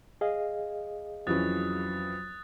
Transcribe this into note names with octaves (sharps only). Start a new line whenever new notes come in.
G#4 D#5 F5
F2 E3 F#3 C#4 D#6 F#6 A6